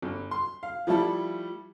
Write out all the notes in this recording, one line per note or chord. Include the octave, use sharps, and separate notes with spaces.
G1
C6
F5
F3 G3 A3 E4 A4